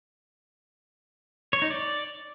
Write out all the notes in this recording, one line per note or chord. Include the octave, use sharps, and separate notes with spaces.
C#5
D#4
D5